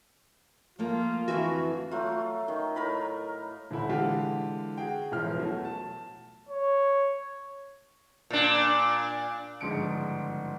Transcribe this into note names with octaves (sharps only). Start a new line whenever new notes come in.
F3 A3 A#3 F4
F2 D3 E3 A3 F#4
F#3 A3 F4
D#3
A2 A#4 B5
D#1 D2 E4 B5
D3 E3 G#3 F4 G4
F#4 G#4 G5
E1 A1 F3 F6
B2 F#3 A3
A5
C#5
A#2 D4
G1 G#2 C#3 F3 C#7 D7